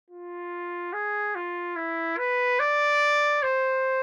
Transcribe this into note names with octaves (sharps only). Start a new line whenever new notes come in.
F4
G#4
F4
E4
B4
D5
C5